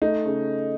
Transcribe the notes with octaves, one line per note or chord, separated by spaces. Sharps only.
A3 D#4
C#3